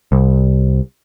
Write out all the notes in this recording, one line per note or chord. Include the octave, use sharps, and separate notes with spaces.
C2